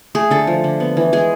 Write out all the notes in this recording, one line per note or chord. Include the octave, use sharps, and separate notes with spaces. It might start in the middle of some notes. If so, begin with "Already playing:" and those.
A3 G#4
D3 A4
F3
D3
B3
E3
G#3 G#4